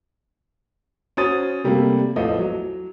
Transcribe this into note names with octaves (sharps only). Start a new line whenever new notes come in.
C#4 F#4 C5 D#6 A6 D#7
C3 G3 A3 A#3
A1 E2 F3 A3 F4 D#5
F#3